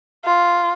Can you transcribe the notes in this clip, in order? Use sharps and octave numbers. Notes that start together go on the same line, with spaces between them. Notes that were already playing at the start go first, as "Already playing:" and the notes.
F4